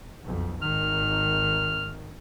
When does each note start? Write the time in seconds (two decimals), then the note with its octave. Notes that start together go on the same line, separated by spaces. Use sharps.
0.24 B1 F2
0.62 G#1 D#3 F6